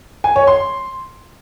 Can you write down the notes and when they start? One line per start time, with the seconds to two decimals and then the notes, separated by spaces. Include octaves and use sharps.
0.24 G#5
0.36 C#5
0.47 C6